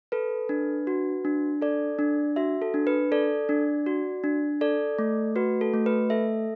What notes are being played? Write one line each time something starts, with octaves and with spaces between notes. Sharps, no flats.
A4 B4
D4
F#4
D4
A4 D5
D4
F#4 E5
A4
D4
B4
A4 D5
D4
F#4
D4
A4 D5
A3
F#4 B4
A4
A3
B4
A4 E5